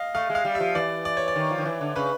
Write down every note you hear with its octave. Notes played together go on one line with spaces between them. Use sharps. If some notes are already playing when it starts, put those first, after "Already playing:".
Already playing: D#5 F5
A3 F5
G#3
F5
G3
E5
F3
E3 D5
D5
C#5
D5
D#3
F3
D#3
E3
D3
C#3 B4